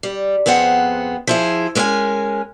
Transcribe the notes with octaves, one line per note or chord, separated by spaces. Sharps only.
G3
F2 B3 C4 G#4 F#5
F3 E4 G#4
G#3 A#3 C#4 A#4 G#5